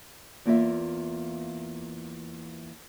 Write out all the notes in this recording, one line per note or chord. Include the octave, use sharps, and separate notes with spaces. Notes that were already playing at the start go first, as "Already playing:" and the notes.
E2 A#3 F4 E5